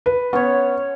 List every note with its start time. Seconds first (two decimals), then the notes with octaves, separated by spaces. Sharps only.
0.06 B4
0.33 B3 C#4 C#5